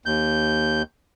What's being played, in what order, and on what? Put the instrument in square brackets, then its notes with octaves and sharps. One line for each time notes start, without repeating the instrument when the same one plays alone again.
[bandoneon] D#2 G6